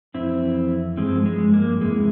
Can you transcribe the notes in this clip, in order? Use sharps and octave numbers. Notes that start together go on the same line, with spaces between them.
F2 E3 C4 E4
G2 F3 G#3 C4
G#3
A#3
E2 C3 E3 G#3